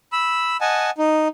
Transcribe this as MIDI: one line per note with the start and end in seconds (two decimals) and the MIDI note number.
0.12 0.57 83
0.12 0.57 88
0.61 0.90 75
0.61 0.90 78
0.61 0.90 80
0.61 0.90 81
0.98 1.28 63